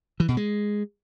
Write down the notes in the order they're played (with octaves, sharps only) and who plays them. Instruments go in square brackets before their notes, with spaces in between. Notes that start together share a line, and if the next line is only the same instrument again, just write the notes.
[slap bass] E3
B2
G#3